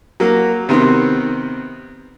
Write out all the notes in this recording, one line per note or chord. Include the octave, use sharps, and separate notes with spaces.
F#3 A#3
C3 D#3 B3 C4